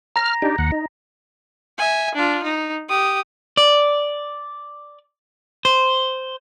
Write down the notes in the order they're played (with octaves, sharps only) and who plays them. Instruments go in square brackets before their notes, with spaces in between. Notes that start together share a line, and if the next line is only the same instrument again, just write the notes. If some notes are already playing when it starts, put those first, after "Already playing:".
[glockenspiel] A#5 A#6 [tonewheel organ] F6
[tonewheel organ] D4 D#4 G4
D#2 F#5
D#4
[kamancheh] E5 G#5
D4 F4
D#4
G4 D#6
[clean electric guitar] D5
C5